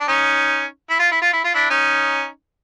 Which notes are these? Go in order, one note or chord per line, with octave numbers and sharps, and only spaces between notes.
D4
C#4 D#4
E4
F4
E4
F4
E4
F4
D4 E4
C#4 D#4